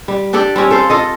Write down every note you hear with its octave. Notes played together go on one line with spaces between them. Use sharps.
G3
D4 G4 A4 D5
G3 C4 C#4
A4 C5 F5
F4 A4 D#5